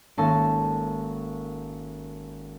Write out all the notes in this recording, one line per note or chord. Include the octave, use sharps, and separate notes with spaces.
G#1 A#3 C#4 A4 A5 C6